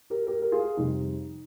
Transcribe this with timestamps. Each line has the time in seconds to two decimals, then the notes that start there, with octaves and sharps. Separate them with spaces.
0.10 G4 A#4
0.27 G4 A#4
0.42 A#4
0.52 F4 G#4
0.77 F2 C3 G3 D#4